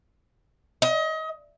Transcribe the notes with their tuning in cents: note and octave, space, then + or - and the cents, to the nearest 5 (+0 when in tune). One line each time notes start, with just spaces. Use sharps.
D#5 +30